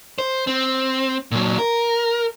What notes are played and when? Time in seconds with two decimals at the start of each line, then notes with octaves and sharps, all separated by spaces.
0.19 C5
0.47 C4
1.32 A#2 F#3
1.59 A#4